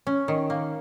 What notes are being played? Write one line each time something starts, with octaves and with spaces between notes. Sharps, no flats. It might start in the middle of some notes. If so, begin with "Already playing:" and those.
C#4
D#3
A#3